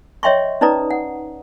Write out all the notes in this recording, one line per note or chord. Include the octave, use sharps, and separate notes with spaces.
C#5 D#5 E5 G5 C6 C#6
C#4 D#4 B4 D5 A#5 D#6
F#5